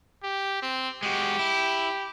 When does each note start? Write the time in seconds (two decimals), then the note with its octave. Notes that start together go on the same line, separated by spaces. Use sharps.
0.23 G4
0.62 C4
1.03 G#3 F#4 G4
1.39 E4